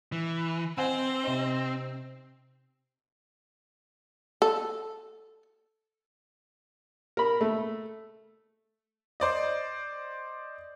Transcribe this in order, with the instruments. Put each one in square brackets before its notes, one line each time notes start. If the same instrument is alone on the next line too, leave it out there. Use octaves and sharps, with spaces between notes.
[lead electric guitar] E3
[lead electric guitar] C4 [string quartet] C5 [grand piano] D#5 F#5 G#5
[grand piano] C3 D#4
[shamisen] A4
[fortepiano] A#4 B5
A3
[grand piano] C5 D5 D#5